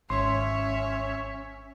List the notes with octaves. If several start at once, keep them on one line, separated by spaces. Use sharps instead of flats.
G#1 C#4 C#5 E5 C6